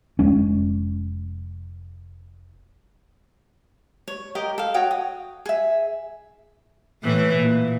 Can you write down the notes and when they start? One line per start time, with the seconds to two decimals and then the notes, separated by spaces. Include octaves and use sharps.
0.19 F1 F2 G#3 C#4
4.08 C#5
4.35 G4 A#4 D#5 G5
4.58 A4 F5
4.74 F#4 C#5 G5 D#6
4.91 D#6
5.46 G#4 E5
7.03 A2 E3 E4
7.37 A#2